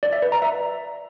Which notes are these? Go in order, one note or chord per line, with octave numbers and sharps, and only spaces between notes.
D5
E5
B4
A#5
E5